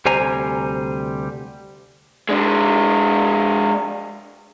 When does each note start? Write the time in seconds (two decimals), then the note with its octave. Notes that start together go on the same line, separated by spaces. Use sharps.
0.05 D2 C3 G3 C5 G#5 A#5
2.29 G#3 D4